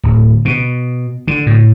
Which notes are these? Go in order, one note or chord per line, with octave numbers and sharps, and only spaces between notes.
D1
B2
D3
A2